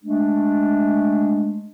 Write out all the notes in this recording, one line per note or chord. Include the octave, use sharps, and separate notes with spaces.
G#3 A3 D4